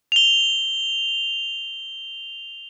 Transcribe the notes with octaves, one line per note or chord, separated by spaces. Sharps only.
F7 G7